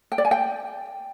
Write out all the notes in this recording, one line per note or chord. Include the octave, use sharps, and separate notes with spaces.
G5
D5
G#5
G5